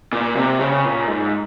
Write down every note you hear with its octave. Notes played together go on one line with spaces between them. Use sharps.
A#2
C3
C#3
A#2
G#2